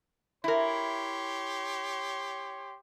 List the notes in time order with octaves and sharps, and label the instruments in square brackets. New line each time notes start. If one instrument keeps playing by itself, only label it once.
[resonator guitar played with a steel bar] E4 A#4 [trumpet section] G4 C#5 C6